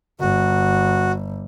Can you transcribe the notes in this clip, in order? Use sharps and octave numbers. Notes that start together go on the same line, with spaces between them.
G1 F#4